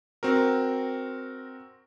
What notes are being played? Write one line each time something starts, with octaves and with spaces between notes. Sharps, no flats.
C4 F#4 A#4